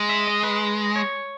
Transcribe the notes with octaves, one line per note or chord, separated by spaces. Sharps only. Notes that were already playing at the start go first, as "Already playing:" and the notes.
Already playing: G#3
E5
D#5
B4
C#5